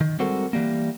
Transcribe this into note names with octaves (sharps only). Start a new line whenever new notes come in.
D#3
G3 G#3 C4 F#4 A4 A#4
E3 G3 A#3